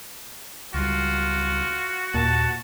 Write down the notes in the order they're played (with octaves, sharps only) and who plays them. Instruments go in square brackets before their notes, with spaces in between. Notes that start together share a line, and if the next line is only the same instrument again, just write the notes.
[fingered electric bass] C#2 G3 [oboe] F4 [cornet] F#4
[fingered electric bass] D#2 [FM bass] A#2 [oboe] A5